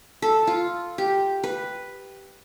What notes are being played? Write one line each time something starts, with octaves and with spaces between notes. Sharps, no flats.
A4
F4
G4
B4